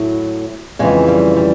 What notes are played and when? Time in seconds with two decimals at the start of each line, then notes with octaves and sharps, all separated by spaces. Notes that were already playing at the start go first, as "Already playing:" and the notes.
Already playing: A2 F#3
0.79 F2 C#3 E3 G#3
1.08 G3
1.36 G3